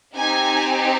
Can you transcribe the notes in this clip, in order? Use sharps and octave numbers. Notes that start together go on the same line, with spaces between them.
C4 D#4 G4 G#5